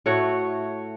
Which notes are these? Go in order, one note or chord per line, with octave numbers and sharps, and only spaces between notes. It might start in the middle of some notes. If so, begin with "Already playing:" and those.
A2 A3 F#4 C#5